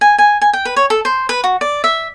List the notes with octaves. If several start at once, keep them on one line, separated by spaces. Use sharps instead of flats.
G#5
G#5
G#5
G5
B4
C#5
A4
C5
B4
F#4
D5
E5